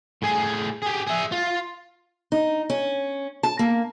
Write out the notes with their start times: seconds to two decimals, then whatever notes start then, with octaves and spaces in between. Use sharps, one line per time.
0.22 A2 G#4
0.82 G4 G#4
1.07 G#4 E5
1.32 F4
2.32 D#4
2.70 C#4
3.43 A5
3.59 A#3